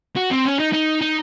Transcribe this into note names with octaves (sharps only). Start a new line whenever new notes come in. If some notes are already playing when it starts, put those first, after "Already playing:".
F#4
C4
C#4
D#4
D#4
D#4